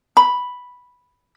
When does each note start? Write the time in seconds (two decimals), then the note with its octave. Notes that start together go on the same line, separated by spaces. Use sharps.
0.17 B5